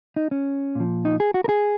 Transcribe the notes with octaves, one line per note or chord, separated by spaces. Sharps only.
D#4
C#4
A#2 F3
D#4
G#4
F#4
A#4
G#4